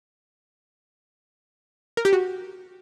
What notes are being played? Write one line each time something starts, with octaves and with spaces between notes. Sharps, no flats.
A#4
G4
F#4